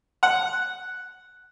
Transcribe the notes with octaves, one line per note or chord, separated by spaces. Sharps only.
F#5